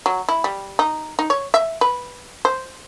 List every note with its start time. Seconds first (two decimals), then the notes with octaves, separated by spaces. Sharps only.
0.06 F#3
0.29 E4
0.44 G3
0.79 D#4
1.19 D#4
1.30 C#5
1.54 E5
1.81 B4
2.45 C5